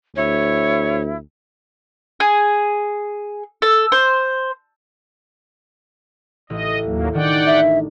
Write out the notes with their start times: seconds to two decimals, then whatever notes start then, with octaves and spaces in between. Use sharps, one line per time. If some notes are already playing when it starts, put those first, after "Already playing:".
0.16 D2 E4 C#5
2.20 G#4
3.62 A4
3.92 C5
6.50 A1 D#5
6.85 D#2 F#3 A#3
7.15 D#3 D4 D5 F#5 G5
7.47 E5